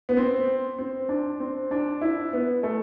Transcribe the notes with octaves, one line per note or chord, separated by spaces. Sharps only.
B3
C4
C4
D4
C4
D4
E4
B3
A3